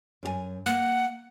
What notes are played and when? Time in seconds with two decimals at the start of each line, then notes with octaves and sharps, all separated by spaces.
0.23 F#2 G4 G#5
0.66 A#3 F#5